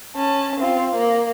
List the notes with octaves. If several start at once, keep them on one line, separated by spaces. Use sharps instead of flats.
C#4 A5
C4 F4
A#3